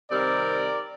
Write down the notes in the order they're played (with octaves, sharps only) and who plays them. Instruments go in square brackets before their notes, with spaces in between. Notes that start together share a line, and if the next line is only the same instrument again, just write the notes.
[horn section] C3 D#3 G3 C4 A#4 D5